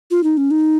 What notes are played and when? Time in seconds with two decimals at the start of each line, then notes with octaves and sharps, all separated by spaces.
0.11 F4
0.23 D#4
0.37 C#4
0.51 D#4